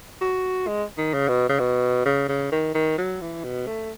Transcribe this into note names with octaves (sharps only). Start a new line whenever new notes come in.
F#4
G#3
D#3
C#3
B2
C#3
B2
C#3
C#3
D#3
D#3
F#3
E3
B2
A3